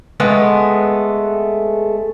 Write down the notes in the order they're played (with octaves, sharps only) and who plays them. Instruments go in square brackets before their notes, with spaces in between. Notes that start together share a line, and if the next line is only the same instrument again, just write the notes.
[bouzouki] G#3 A3 B3